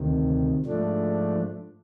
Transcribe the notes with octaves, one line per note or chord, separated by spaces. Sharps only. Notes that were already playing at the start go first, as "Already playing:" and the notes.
Already playing: D2 C3 D#3
G#2 F3 A3 D4